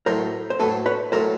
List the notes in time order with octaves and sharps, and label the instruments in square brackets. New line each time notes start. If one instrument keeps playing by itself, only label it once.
[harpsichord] A2 F#3 A3 [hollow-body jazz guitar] A#4 C5
[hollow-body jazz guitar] C5
[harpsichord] A2 F#3 A3 [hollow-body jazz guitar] A4 B4
[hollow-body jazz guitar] B4 C#5
[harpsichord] A2 F#3 A3 [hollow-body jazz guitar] A#4 C5